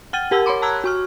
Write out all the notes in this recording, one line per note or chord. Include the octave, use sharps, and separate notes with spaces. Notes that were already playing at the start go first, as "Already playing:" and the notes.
F#5 G5 F6 A6 D#7
G4 A#4 F#5 A5 E6
C#5 F#5 B5 C6 D6
A5 A#5 E6 F#6 G#6
F#4 C#6 F6